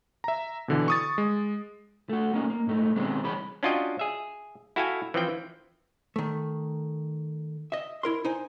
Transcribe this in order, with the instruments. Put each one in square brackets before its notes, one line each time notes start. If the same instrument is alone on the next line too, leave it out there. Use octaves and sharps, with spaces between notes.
[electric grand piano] E5 A#5
B2 D3 E3
C#6 D#6 A6
G#3
[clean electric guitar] A3 F#4
A#3 C#4 D#4
A#3
G#2 A3 D#4
B2 D#3 G3 G#3 C4 C#4
C2 E3 G#4 C#5 B5
[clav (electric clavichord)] C#4 D4 F4 F#4 D#5 G5
G#4 E5
E4 F#4 A4 F5 G5 G#5
E3 F3 C4 G5
[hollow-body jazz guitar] D#3 A3
D#5 E5
E4 A#4 C6
D#4 C5 G#5